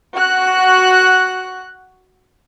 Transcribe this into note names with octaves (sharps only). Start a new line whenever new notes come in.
F#4 F#6